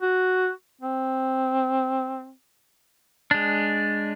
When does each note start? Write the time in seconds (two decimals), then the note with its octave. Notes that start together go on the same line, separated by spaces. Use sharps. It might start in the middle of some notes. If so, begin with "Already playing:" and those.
0.02 F#4
0.81 C4
3.31 G#3 D4